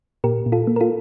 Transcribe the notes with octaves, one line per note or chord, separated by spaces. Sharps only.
A#2 G4 A#4
A#2
F4 A4
A#3
A#4
F4 A4